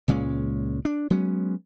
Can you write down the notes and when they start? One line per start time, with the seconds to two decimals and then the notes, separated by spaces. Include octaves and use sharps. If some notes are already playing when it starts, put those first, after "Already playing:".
0.08 C#2 A#2 G#3 C#4
0.85 D4
1.10 F#3 G#3 B3 C#4